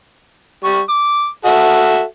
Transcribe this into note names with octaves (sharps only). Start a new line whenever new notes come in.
G3 C#6
D6
F#4 A4 E5